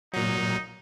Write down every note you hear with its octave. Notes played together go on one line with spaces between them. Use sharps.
A#2 F#3 D#4